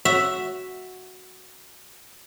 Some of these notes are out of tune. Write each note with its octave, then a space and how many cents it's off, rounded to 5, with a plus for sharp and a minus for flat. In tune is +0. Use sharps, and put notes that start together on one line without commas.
F#4 +0 E5 +0